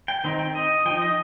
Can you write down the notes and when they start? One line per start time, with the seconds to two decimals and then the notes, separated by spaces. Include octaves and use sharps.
0.08 G5
0.24 D#3 C4 D#4
0.39 G5
0.55 D#5
0.85 F3 D#4 G5
1.02 D#5